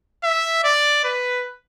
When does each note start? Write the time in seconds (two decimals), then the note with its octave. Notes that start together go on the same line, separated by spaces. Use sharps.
0.24 E5
0.64 D5
1.04 B4